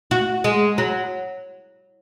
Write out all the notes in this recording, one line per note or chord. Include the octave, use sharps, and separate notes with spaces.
F#4
G#3
F#3